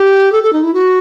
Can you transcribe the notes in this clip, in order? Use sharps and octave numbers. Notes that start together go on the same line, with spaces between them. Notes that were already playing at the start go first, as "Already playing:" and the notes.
Already playing: G4
A4
A4
D#4
E4
F#4